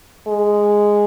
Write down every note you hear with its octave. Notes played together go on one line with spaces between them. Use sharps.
G#3